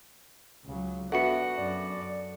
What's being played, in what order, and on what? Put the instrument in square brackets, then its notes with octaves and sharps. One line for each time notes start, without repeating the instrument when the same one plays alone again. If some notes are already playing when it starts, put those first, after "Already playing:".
[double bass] C#2 F#3 [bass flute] C#3
[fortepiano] B3 F#4 F#5 [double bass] D4 [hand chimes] A4 C#7 [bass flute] E5
[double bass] F#2 [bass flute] D5